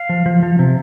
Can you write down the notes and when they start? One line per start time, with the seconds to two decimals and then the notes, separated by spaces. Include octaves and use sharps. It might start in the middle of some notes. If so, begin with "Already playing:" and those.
Already playing: F5
0.09 F3
0.26 F3
0.43 F3
0.59 C3